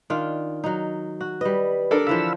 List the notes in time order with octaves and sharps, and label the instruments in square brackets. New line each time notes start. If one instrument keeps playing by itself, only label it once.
[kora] D#3 D4 F4
F#3 D#4
F#4
[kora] G3 D#5 [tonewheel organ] B4
[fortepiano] D4 A4 A#4
[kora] D3 E3 F3 [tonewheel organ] F5 B5 E6